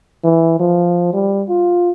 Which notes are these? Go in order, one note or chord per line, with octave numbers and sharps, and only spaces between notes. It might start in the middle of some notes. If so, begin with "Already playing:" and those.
E3
F3
G3
F4